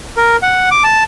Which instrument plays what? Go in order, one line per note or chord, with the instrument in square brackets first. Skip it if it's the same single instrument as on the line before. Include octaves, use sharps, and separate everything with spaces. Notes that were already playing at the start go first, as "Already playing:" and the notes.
[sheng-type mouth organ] A#4
F#5
D6
A5